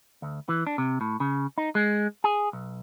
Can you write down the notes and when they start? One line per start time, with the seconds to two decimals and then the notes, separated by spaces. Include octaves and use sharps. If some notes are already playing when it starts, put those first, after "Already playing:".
0.22 D2
0.49 E3
0.67 D4
0.78 C3
1.01 A2
1.20 C#3
1.58 D#4
1.75 G#3
2.24 G#4
2.53 B1